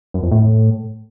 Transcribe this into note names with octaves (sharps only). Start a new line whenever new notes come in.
F#2
F2
A2